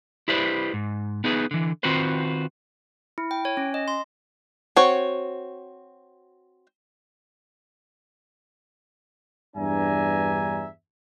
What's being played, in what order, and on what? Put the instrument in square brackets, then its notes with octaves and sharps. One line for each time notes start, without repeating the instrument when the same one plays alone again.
[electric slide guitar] E4 G4 B4 C5 D5
G#2
B3 D#4 G#4 B4
D3 E3
D#3 C4 F4 F#4 B4 C5
[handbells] E4
G5
C#5
C#4
D#5
C6
[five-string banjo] C4 F#4 C#5
[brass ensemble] E2 G2 D4 E5 G#5 A#5